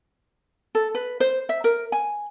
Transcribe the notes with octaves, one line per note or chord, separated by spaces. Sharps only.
A4
B4
C5
E5
A#4
G#5